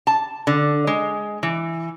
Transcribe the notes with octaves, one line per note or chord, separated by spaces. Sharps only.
A5
D3
G#3
E3